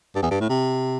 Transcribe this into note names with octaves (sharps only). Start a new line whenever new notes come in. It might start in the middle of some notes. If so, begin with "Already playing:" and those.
G2
E2
G2
A2
C3